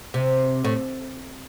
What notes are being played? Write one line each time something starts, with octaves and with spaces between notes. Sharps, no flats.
C3
A2